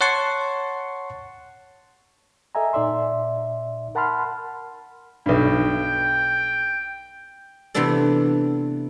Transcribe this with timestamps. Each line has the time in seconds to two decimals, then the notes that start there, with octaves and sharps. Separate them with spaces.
0.01 C#5 F#5 A5 C6 C#6
2.55 A4 D#5 E5 G#5 A#5
2.73 A#2 D#4 D5 E5 C6
3.95 A#4 F#5 A5 B5 C6 F6
5.26 B1 G2 G5
7.75 C3 E3 A3 B3 D4 A4